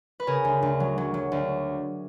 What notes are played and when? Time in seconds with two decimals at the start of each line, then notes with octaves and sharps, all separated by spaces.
0.20 B4
0.27 C#3 G#4 A#4
0.45 D2
0.62 D2
0.80 F#3
0.98 F#3
1.14 F#3
1.32 D2